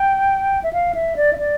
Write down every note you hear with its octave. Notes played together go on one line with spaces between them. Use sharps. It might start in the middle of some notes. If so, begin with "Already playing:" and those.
Already playing: G5
E5
F5
E5
D5
E5
D5